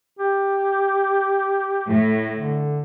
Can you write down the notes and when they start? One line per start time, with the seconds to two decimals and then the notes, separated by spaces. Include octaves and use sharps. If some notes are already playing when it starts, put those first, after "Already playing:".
0.19 G4
1.87 A2
2.34 D3